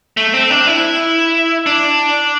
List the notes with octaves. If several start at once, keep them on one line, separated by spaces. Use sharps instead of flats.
A3
C4
D4
E4
D4